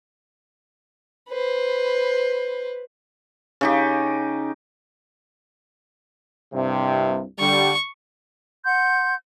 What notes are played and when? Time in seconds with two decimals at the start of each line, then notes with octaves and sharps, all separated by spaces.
1.28 B4 C5
3.61 C#3 D#4 G4
6.54 C2 G2 C3
7.40 D3 G3 C#6
8.65 F#5 C6 G6